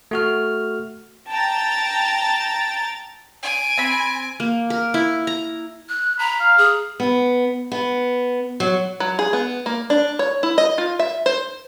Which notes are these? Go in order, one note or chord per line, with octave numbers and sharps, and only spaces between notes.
A3 F#4 F6
G5 A5 A#5 A6
G#5 D7
C4 B5
A#3
A#4
E4
A#5
F#6
A#5 B5
F5
G#4
B3
B3
F#3
F#3
G#4
B3
A#3
D4
C#5
E4
D#5
F4
E5
C5